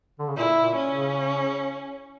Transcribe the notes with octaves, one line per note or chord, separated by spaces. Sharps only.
D3
C#3
A#2 E4
A#2
C#4
C#3